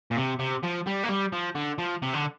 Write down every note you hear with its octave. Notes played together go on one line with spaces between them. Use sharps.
A#2
C3
C3
F3
G3
A#3
G3
F3
D3
F3
C3
D3